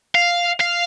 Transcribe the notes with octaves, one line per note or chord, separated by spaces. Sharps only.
F5
F5